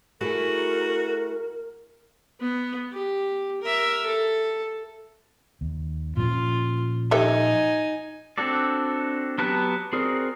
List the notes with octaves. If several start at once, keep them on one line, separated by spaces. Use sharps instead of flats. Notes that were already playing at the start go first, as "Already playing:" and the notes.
A3 E4 F#4 G#4 A#4
B3
G4
A#4 E5
A4
D#2
A#2 F3 C#4 F4
D#4 G4 A4 E5 G#5
C4 D4 F#4 A4 D5
F#3 B3 G4 A5 F#6
C4 F#4 G#4 A#4 D5